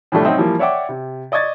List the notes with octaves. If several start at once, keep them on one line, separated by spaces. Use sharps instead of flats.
A2 C3 F3 G3 A3 D4
F#3 C4 C#4 D#4 D#5 E5
E3 F3 G3 A#3
C#5 D5 E5 F#5 G5 D6
C3
D5 D#5 C#6 G#6 A6